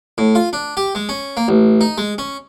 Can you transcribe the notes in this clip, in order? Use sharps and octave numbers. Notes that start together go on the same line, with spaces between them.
A2
F4
D4
G4
G#3
C#4
A#3
A1
D#4
G#3
C#4